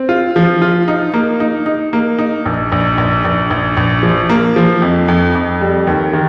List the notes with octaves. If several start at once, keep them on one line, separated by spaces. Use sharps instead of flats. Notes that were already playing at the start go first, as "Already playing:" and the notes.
Already playing: C4
F4
F3
F4
D#4
A#3
D#4
D#4
A#3
D#4
A#1
A#1
A#1
A#1
A#1
A#1
F3
A#3
F3
F2
F2
F2
G3
D#2
D#3